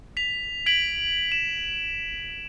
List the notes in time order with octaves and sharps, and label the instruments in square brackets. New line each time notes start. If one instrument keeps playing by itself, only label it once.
[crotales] B6 F7
G#6 B6 D7 F#7
E7